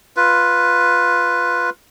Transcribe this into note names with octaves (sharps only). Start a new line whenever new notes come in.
F4 B4